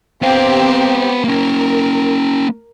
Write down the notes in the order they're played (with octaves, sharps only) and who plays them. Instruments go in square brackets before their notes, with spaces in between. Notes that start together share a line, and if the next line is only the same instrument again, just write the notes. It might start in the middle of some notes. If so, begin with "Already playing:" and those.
[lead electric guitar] B3 F5 [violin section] C4 G4
[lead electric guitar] A#3 C#4 [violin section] A#4